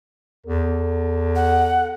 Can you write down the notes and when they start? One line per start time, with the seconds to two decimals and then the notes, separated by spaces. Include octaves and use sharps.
0.46 E2 A4
1.35 F#5